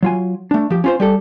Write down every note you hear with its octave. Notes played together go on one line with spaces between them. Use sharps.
F#3 F4 G#5
A3 D4
F3 G4
C#4 F4 C5
G3 G4 A4